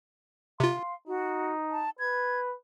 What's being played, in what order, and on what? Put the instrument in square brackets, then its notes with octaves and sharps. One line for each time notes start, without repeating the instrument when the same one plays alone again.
[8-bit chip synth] C3 F4 [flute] F5 [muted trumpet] C6
[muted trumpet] D#4 [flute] F#4
[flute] A5
[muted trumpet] B4 [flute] G#6